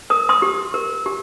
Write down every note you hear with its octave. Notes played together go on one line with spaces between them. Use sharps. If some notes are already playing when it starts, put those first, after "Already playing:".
A#4 D#6
C6 D#6
G4
A#4
G4